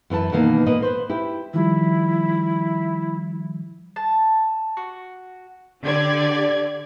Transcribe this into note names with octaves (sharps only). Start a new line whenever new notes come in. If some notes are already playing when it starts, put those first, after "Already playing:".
F#2 E3 E4 A5
B2 D#3 E3 A#3 B3
A#2 A#3 B4 D#5
B4 C5
E4 G4
D#3 F3 G3 E4
A5
F#4
D3 G4 D5 G#6